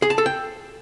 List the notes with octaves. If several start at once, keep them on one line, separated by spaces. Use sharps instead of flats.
G#4
A5
A4
G5